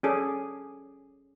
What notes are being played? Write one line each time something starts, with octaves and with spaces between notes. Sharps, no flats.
C#4 G#4 A4 D5